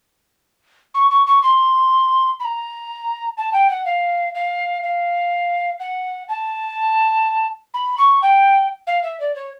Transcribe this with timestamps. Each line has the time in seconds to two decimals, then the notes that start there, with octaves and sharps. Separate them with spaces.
0.94 C#6
1.11 C#6
1.27 C#6
1.43 C6
2.40 B5
2.45 A#5
3.37 A5
3.53 G5
3.70 F#5
3.85 F5
4.35 F5
4.83 F5
5.80 F#5
6.29 A5
7.74 B5
7.98 C#6
8.22 G5
8.87 F5
9.03 E5
9.20 D5
9.36 C#5